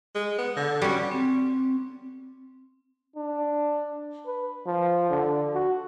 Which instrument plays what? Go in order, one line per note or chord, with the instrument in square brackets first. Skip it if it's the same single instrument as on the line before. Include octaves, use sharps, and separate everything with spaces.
[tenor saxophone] G#3
B3
D3
[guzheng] G3 C#4 [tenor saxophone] F#4
[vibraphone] C4
[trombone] D4
B4
F3
D3
F#4